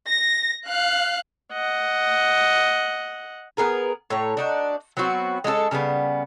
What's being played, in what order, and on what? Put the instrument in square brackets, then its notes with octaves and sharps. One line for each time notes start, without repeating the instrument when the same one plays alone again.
[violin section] A#6
F5 F#6
[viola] D#5 F#5
[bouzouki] B3 G#4 A#4 B4
A2 C#5 A#5
D4 D#4 F#4
F#3 B3 C4 F#4
G#3 C#4 E4 A4
C#3 G3 A3 B3